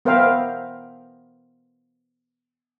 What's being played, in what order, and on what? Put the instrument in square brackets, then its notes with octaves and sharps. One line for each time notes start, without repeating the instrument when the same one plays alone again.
[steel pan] B3 A#4 C5 E5 F5 G5